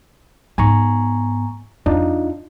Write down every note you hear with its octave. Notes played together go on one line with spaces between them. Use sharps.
G#2 B3 G#5 A#5 C#6
F2 D4 D#4 F4